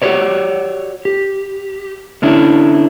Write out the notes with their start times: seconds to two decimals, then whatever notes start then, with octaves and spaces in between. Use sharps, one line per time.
0.02 F#4 G4 A#4 B4 C#5 D5
1.05 G4
2.22 D3 C#4 D4 E4